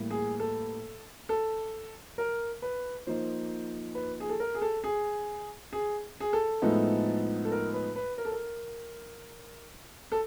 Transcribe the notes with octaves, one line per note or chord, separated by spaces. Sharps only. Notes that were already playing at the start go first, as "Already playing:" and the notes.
Already playing: A2 E3 G3 A#3
G#4
A4
A4
A#4
B4
F3 A#3 D#4 C5
B4
G#4
A4
A#4
G#4
A4
G#4
G#4
G#4
A4
A2 F3 G#3 B3 D#4
A4
A#4
B4
B4
A#4
A4
A#4
A4